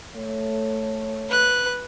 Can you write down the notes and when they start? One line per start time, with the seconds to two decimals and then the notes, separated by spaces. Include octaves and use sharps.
0.16 A3 C#5
1.29 B4 F#6